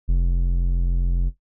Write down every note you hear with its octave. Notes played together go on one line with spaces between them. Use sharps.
F1